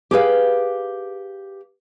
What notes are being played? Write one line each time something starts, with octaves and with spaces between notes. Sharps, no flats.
G4 G#4 B4 F5